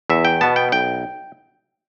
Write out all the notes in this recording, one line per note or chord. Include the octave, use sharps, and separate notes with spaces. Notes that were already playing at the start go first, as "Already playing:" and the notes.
E2 E5
G5
B2 B3 A5
G5
B1 G5